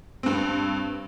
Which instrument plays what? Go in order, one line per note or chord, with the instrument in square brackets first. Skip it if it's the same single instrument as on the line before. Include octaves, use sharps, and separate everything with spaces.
[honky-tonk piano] G2 C4